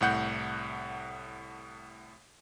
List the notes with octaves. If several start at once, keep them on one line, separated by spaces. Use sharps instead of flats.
C2 A2 F#5 G6